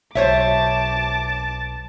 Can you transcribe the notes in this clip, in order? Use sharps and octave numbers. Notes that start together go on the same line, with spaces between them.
B1 C5 C#5 E5 A5 D6